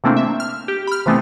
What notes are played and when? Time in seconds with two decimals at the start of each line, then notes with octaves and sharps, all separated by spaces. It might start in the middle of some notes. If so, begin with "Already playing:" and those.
0.04 C3 E3 A3 A#3 C4 D4
0.17 E5
0.40 F6
0.68 G4
0.87 B5 F6
1.06 C3 E3 A3 B3 C4